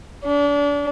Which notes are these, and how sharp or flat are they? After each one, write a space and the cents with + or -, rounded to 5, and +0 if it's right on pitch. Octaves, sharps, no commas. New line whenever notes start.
D4 -35